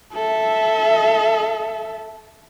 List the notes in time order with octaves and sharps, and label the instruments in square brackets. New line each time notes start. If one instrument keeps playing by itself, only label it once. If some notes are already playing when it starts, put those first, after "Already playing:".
[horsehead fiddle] A4 E5